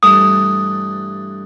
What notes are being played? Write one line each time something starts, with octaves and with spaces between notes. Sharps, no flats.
G2 E3 A3 D#6